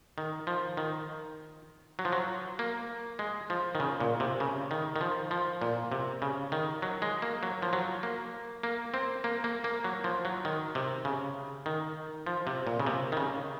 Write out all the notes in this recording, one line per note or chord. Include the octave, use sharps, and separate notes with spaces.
D#3
F3
D#3
F#3
F3
F#3
A#3
G#3
F3
D#3
C#3
A#2
C3
C#3
D#3
D#3
F3
F3
A#2
C3
C#3
D#3
F#3
G#3
A#3
F#3
F3
F#3
A#3
A#3
C4
A#3
A#3
A#3
F#3
F3
F#3
D#3
C3
C#3
D#3
F3
C3
A#2
C#3
C3
D#3
C#3